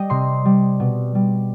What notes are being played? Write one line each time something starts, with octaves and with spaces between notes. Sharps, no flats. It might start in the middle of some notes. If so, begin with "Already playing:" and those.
Already playing: G3 D#5 G5
C3 C6
G3
B2
G3